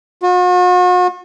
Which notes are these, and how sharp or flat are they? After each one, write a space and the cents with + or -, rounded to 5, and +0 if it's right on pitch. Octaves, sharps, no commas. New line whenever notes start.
F#4 -45